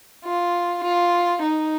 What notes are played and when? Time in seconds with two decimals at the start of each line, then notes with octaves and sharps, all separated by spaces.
0.24 F4
0.83 F4
1.42 D#4